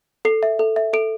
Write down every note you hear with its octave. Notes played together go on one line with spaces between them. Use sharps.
A4 C7
E5
A4
E5
A4 D7